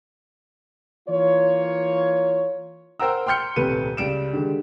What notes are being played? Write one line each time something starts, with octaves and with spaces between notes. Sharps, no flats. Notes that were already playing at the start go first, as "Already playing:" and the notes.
E3 A#3 F4 C#5
A#4 C5 F#5 G5 A#5 E6
G5 C6 F6 G6 C#7
D#1 C2 A3 B4 D#7
C#2 G3 D7 E7
D3 D#3 G#3 G4